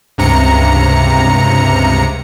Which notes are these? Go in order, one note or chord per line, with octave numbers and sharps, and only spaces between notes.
C#2 G2 C3 A#5 C#7